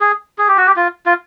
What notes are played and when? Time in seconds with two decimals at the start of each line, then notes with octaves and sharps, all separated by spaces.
0.01 G#4
0.38 G#4
0.48 G4
0.58 F#4
0.67 G4
0.76 F4
1.06 F4